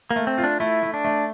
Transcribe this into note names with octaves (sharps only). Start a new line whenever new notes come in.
A#3
A3
C4
F4
D4
A3 E4
A3
D4
A3